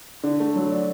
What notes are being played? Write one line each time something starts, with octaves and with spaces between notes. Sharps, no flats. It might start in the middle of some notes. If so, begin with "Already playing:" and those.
D3
A3
F#3
D4